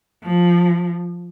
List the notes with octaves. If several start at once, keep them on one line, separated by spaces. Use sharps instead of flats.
F3